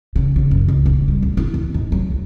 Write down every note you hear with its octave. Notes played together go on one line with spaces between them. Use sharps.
C#3
C#3
F#2
C#2
D#1
G3
D2
E4
E2
G#2
F#3
D2